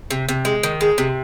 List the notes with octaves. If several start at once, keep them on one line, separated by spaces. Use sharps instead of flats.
C3
C3
G#3
D#3
G#3
C3